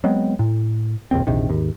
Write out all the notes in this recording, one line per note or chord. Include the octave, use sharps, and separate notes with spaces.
F#3 G#3 B3 C4
A2
F1 A#1 D#2 C4
A#1 E2 C3 D#3
G#1 D#2